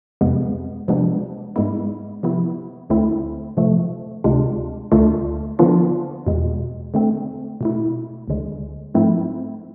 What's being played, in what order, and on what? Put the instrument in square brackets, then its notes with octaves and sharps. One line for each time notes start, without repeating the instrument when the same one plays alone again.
[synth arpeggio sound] F2 C3 G#3 B3
C3 F3 G#3 B3 D4
G#2 G#3 B3 E4
C3 F3 B3 E4
D2 D3 A3 C4 E4
C3 F3 A3
D2 C3 G#3 D4 F4
D2 D3 A3 D4 F4
D3 F3 B3 D4 F4
E2 B2 G#3
D3 A3 C4
B2 A3 E4
D2 D3 G#3
G#2 F3 A3 C4 E4